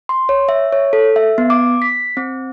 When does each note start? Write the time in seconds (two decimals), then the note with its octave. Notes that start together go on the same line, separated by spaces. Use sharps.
0.09 C6
0.29 C#5
0.49 E5
0.73 C#5
0.93 A4
1.16 E5
1.38 B3
1.50 D6
1.82 B6
2.17 C4